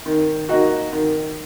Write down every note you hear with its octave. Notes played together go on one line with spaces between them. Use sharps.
D#3
A#3 D#4 F#4
D#3